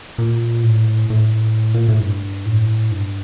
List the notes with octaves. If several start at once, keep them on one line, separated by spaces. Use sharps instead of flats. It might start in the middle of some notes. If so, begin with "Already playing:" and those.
A#2
A2
A2
A#2
A2
G2
A2
G2